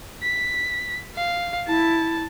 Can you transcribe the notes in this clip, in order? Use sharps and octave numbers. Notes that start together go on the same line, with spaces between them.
B6
F5
E4 A5